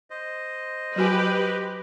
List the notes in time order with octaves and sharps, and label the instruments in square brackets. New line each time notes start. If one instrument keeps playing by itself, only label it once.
[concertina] C5 D#5
[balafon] F#3 F#4 G#5 [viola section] G4 B4